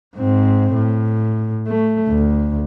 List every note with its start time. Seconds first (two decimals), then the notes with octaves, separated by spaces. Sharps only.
0.17 G#2 C4
0.74 A2
1.67 A3
2.08 D2